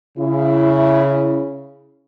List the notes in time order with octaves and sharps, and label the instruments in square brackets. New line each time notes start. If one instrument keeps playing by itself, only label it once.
[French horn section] C#3 E4